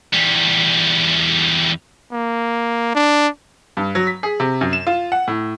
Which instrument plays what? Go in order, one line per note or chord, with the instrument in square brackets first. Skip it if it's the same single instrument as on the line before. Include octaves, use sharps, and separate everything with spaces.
[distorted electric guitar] E2 G3
[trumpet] A#3
D4
[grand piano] G2
F#3
B6
G#4
C3
F#2
E7
F4
F#5
A2